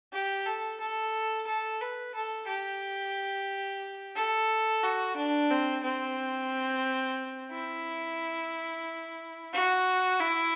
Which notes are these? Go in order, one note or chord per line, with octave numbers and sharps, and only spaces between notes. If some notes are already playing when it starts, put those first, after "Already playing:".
G4
A4
A4
A4
B4
A4
G4
A4
F#4
D4
C4
C4
E4
F#4
E4